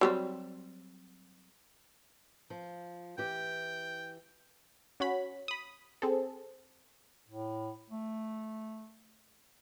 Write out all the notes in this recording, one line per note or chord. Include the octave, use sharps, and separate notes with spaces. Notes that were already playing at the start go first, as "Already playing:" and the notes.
F#3 G3 C4
F3
E3 G4 G5
C#4 F#4 C#5 B5
B5 D#6
C4 G#4 A4
A2
A3